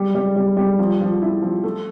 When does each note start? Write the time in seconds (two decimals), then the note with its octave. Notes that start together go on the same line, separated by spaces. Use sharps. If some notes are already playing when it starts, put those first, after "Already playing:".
Already playing: G3
0.15 G3
0.36 G3
0.57 G3
0.79 F3
1.01 F3
1.22 E4
1.42 F3
1.64 A3